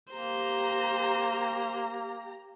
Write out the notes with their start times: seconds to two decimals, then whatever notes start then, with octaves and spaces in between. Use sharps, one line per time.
0.13 A#3 G4 C5 A#5